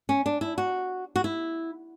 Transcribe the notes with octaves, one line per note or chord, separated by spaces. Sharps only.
C#4
D4
E4
F#4
F#4
E4